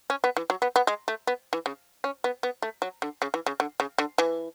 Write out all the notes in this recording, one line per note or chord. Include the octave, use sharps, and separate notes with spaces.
C#4
B3
E3
F#3
B3
B3
G#3
A3
B3
E3
C#3
C#4
B3
B3
A3
F#3
D3
C#3
E3
C#3
D3
C#3
D3
E3